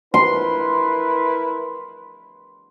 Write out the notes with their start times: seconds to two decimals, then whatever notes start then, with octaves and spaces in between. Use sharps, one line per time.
0.14 E4 A#4 B4 C6